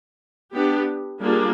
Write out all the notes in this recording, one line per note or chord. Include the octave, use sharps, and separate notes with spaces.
B3 D4 G4
G3 A#3 D4 F4 G#4